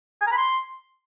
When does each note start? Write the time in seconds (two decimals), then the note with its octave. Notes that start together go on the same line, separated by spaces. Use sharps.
0.21 G#5
0.27 A#5
0.32 B5
0.37 C6